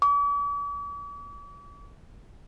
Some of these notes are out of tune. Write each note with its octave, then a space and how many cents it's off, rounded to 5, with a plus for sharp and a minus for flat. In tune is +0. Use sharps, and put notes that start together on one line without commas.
D6 -45